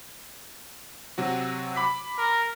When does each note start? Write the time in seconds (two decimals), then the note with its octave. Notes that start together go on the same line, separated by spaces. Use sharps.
1.18 C3 F#3 F#4
1.76 B5 D6 B6
2.18 A#4